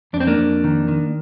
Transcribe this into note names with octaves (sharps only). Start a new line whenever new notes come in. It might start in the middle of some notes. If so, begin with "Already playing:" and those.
F2 D4
C4
A#3 D4
F2
D#3
D#3